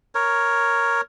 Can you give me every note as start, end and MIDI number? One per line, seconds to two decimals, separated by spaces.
0.15 1.01 70
0.15 1.01 73